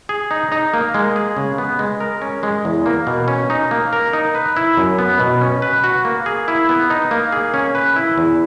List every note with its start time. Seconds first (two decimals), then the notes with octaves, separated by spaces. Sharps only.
0.09 G#4
0.31 D#4
0.52 D#4
0.74 A#3
0.94 G#3
1.16 G#4
1.37 C#3
1.58 B3
1.79 G#3
2.00 A#4
2.22 C#4
2.43 G#3
2.65 E2
2.86 A#3
3.07 B2
3.28 C#4
3.50 D#4
3.71 A#3
3.93 A#4
4.13 D#4
4.35 B4
4.56 E4
4.77 F#2
4.99 B3
5.20 B2
5.41 C#4
5.62 B4
5.84 F#4
6.05 A#3
6.26 G#4
6.48 E4
6.69 B3
6.90 D#4
7.11 A#3
7.32 G#4
7.54 C#4
7.75 B4
7.96 E4
8.18 E2